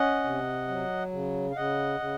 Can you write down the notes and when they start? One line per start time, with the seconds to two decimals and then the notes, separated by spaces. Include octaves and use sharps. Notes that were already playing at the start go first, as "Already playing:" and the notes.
Already playing: C#4 D#5 F#5
0.24 C3
0.68 F#3
1.12 C#3
1.51 F5
1.56 C#3 D#5 F#5
2.00 C#3